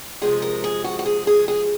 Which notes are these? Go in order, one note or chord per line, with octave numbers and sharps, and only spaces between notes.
C3 F3 G#3 G#4
A#4
G#4
F#4
F#4
G#4
G#4
G#4